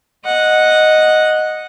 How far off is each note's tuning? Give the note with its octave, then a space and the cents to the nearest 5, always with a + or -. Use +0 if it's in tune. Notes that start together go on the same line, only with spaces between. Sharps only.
D#5 +0 F#5 -10